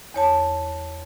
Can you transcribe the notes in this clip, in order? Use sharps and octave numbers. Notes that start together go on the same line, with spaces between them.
E2 C#5 A5